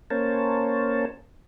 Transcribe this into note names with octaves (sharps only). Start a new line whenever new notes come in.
A#3 C#4 A#4 C5 C#5 A5